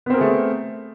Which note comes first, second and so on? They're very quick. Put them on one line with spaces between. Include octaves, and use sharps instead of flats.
B3 C4 A#4 G#4 A3